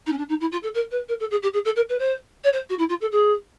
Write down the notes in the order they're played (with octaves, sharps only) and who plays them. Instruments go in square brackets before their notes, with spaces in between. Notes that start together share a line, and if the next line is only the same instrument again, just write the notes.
[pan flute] D#4
C#4
D4
D#4
E4
F4
A4
A#4
B4
A#4
A4
G#4
G4
G#4
A4
A#4
B4
C5
C#5
C5
F#4
E4
F4
A4
G#4